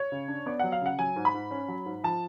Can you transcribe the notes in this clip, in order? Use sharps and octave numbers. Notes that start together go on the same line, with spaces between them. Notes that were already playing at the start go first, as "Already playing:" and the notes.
Already playing: C#5
C#3
D4
B3 D5
F#3 F#5
F5
C#3 F#5
F#3 G#5
G#2
B5
G#2
C#4
F#3
G#2
F3 A5